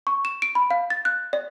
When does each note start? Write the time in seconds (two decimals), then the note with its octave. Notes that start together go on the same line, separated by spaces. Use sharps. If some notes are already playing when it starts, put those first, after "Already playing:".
0.07 C#6
0.25 E7
0.42 D7
0.55 B5
0.71 F5
0.90 A6
1.05 F#6
1.33 D5